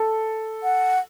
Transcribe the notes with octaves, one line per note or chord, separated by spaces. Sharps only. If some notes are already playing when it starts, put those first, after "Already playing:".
Already playing: A4
F#5